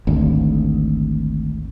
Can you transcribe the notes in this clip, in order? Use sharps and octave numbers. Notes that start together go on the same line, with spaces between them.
G#1 D2